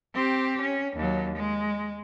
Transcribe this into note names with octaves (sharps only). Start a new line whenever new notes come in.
C4 G4
C#4
D#2 F#3
G#3